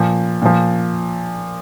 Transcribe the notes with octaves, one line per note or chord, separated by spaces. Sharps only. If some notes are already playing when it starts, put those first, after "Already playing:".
Already playing: A#2 F3
A#2 F3